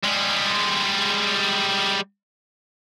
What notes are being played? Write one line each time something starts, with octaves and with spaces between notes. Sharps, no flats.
G3 G#3